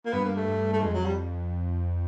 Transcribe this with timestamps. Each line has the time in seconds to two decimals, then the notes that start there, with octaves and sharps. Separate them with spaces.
0.06 A#3
0.13 G2 B3
0.25 A#3
0.37 A3
0.48 G2
0.73 A3
0.82 F2 G#3
0.94 F#3
1.05 G3